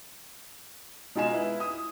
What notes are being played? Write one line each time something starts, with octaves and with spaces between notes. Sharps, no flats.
B2 G#3 D#4 F4 G#5 E7
E4 B4
D#6